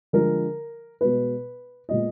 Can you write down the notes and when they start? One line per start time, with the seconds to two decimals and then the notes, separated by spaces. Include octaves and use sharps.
0.13 D3 F3 G#3 A#4
1.01 B2 G#3 B3 B4
1.89 A#2 G#3 B3 D#5